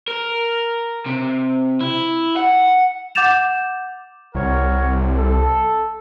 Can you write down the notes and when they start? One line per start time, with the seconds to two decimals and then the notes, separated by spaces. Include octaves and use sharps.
0.08 A#4
1.06 C3
1.81 E4
2.36 F#5
3.15 F#5 D6 G6 A6 E7 F7
4.35 C2 A#4 C#5 F#5
5.18 A4